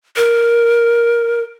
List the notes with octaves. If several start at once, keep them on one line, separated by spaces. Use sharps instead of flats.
A#4